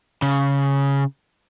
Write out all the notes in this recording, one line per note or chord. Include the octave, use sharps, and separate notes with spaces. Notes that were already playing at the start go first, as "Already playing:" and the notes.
C#3